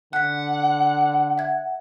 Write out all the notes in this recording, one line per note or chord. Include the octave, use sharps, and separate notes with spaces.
D3 F#5 F#6 B6
E5 G#6